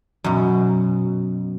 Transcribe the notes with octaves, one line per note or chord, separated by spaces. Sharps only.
F#2 B2